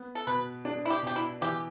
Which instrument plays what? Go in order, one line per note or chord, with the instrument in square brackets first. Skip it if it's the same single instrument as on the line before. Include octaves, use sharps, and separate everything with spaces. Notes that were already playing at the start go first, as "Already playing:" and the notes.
Already playing: [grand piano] B3
[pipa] A4
[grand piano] B2 [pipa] B4
[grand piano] D4
[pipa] E4
G4
[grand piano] B2 [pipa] G4
[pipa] E4
[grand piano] E3 [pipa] G4